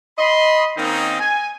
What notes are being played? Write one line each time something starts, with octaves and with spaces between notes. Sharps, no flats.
D#5 B5 C6
D#3 A#3 C4 C#4 D#4
G#5